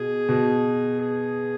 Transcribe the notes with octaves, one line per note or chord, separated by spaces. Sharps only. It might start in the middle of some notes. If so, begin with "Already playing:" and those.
Already playing: B2 G#4
B2
G#4